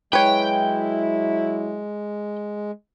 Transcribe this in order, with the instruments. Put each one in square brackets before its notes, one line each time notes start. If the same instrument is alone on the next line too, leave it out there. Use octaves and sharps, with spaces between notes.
[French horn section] F#3 E4 [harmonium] G#3 [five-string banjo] B4 C#5 [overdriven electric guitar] G5